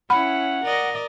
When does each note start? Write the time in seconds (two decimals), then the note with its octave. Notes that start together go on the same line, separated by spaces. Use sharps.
0.10 C#4 E4 F#5 B5
0.65 A#4 D5 D#5